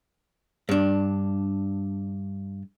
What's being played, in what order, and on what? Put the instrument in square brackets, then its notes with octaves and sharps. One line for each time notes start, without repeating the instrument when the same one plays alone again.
[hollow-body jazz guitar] G2 D4